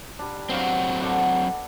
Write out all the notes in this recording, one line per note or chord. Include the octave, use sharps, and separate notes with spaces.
G3 D4
F#3 B3 C4 D4 F5
A4 D5 F#5